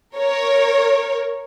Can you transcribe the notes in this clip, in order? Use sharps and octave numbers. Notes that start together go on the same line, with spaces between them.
A#4 C#5